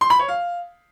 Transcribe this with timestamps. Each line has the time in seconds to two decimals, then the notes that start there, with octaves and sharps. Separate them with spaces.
0.01 C6
0.10 B5
0.19 C#5
0.28 F5